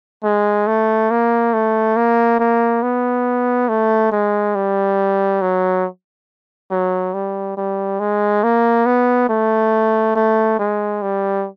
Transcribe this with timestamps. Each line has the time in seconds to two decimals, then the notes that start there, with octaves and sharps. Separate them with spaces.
0.24 G#3
0.67 A3
1.10 A#3
1.53 A3
1.96 A#3
2.39 A#3
2.83 B3
3.69 A3
4.12 G#3
4.55 G3
5.42 F#3
6.71 F#3
7.14 G3
7.57 G3
8.00 G#3
8.43 A#3
8.86 B3
9.29 A3
10.15 A3
10.59 G#3
11.02 G3